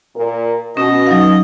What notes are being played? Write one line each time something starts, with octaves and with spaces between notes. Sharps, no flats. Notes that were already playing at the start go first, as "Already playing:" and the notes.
A#2 A#4
B2 C#4 D#5
F#3 D#4 F5